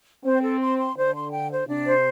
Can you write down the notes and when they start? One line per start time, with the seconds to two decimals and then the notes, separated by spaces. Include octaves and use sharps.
0.24 C4 C5
0.42 A4
0.60 C6
0.78 C6
0.96 D3 C5
1.14 C6
1.31 G5
1.50 C5
1.67 C3 D4
1.86 C5